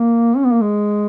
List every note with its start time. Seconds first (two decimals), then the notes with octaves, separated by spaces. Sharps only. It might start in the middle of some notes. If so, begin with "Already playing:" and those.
Already playing: A#3
0.36 C#4
0.45 B3
0.53 A#3
0.61 G#3